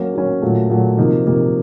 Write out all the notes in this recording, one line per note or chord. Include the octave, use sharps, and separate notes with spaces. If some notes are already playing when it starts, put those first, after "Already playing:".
Already playing: F#3 A#3 C#4
F#3 A#3 C#4
A#2 F#3 A3
A#2 F#3 A3
C3 F3 A#3 D#4
C3 F3 A#3 D#4